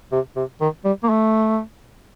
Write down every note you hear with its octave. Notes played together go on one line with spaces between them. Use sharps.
C3
C3
D#3
G3
A#3
A3